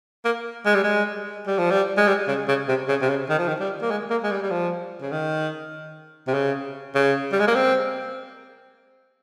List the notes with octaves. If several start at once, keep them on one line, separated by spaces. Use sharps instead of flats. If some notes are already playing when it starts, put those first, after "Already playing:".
A#3
G#3
G3
G#3
G3
F3
G3
G#3
G3
C#3
C#3
C3
C#3
C3
C#3
D#3
F3
D#3
G3
A#3
G#3
A#3
G#3
G3
G3
F3
C#3
D#3
C3
C#3
C#3
G3
G#3
A#3
C4